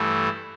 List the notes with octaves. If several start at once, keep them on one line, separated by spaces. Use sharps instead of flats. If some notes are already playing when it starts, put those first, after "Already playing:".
Already playing: G2 E3 A3